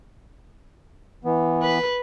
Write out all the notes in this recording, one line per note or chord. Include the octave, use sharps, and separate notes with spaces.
E3 B3
B4